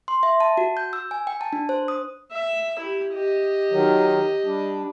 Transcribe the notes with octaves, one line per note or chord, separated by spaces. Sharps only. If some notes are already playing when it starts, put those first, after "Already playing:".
C6
E5
A5
F#4
G6
E6
G#5
G5
A5
D4
C5
D#6
E5
E4 G4
G4 D#5
D#3 F#3
G3 D4